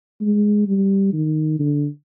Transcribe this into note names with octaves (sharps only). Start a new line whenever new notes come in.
G#3
G3
D#3
D3